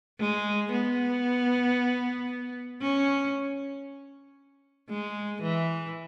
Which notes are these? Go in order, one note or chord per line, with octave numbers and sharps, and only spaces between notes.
G#3
B3
C#4
G#3
E3